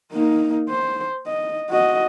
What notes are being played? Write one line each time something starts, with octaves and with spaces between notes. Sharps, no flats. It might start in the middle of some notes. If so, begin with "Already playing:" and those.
A#3 D#4
C5
D#5
F#4 D#5